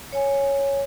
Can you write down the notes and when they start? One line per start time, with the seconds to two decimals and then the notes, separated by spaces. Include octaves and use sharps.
0.12 C#5 G#5